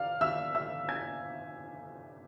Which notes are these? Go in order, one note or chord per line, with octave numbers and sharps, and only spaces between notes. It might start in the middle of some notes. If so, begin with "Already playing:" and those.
Already playing: D5 F5 F6
E5 E6
E5 E6
G#5 G#6